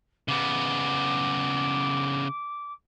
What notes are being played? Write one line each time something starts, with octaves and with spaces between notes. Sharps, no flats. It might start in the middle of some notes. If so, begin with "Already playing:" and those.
C#3 B3 D6